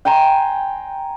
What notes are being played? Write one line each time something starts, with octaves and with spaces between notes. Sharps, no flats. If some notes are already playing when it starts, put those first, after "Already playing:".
G5 G#5 A#5 C6